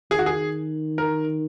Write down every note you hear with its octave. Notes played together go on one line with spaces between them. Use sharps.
D#3 G#4
F#4
G#4
A#4